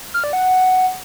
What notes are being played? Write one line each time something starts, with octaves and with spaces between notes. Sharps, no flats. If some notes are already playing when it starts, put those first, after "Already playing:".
F6
D5
F#5